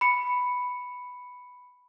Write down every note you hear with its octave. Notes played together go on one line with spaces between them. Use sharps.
B5 C#7